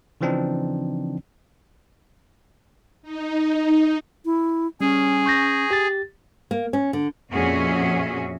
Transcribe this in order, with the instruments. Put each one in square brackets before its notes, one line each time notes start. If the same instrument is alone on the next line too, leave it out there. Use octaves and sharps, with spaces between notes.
[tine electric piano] C#3 E3 F3 C4 D4 D#4
[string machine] D#4
[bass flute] E4
[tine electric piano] G3 [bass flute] C#4 [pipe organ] G#4
[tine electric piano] C#6 G6 A#6
G4 A6
[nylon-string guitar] A#3
C#4
D3
[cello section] F2 A#2 C#4 F#4 G#4 E5